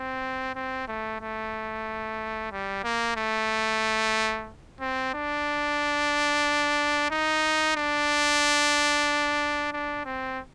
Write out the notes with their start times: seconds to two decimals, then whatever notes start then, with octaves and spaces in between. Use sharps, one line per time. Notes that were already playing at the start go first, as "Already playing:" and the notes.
Already playing: C4
0.55 C4
0.88 A3
1.21 A3
2.52 G3
2.84 A#3
3.17 A3
4.80 C4
5.14 D4
7.11 D#4
7.76 D4
9.73 D4
10.05 C4